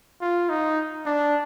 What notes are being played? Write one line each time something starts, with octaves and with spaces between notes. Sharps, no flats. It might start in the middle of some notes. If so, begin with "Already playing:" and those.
F4
D#4
D4